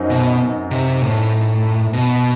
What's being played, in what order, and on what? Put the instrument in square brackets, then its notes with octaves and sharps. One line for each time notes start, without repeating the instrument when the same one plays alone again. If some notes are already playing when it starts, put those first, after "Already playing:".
Already playing: [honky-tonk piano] F#2 C4 D#4
[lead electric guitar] B2
C3
A2
B2